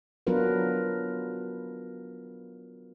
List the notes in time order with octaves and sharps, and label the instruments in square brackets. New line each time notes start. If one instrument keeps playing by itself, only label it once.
[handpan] F#3 B3 D4 F4 A#4 B4